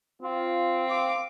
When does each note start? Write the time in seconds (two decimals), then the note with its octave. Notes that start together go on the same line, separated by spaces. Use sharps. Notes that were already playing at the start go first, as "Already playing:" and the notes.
0.22 C4 F4
0.88 F5 D6